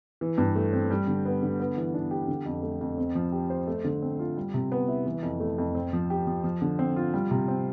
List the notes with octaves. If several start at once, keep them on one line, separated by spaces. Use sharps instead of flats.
E3
G2
A3
C4
G3
D3
B3
D3
B3
E3
D4
G4
D3
F2
A3
F2
C4
F3
G4
C5
A3
D3
C4
F4
G3
C3
B3
E4
E3
F2
A3
F2
C4
F3
G4
F3
F3
D3
C4
F4
G3
C3
C4